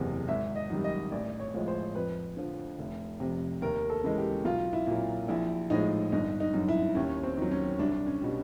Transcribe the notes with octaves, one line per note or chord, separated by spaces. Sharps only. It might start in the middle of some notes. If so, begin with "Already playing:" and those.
Already playing: F#1 E2 C3
G#1 E5
D#5
F#2 D#3 G3
D#5
A1 D5
C#5
A2 F3 G#3
C5
F2 B4
D3 F3
F1
F2 C3
D#2 A#4
A4
C#3 E3 G#3
G4
B1 F4
E4
A#2 F#3
A#1 E4
A2 F3 G#3 D#4
G1 D#4
D#4
F#2 D3
E4
D#2 C#4
C4
D#3 F#3
C#4
C2 D4
C#4
B2 G3